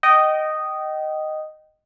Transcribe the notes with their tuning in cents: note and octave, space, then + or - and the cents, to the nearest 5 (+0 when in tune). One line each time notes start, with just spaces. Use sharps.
D#5 -5 G5 -30